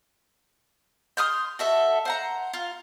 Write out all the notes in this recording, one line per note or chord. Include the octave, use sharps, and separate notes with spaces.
C6 D#6 F6 G6
F#4 A4 E5
C5 F#5 A#5
F4